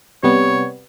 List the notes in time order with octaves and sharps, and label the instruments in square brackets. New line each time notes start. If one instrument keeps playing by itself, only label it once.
[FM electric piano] C3 G3 B3 [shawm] C#5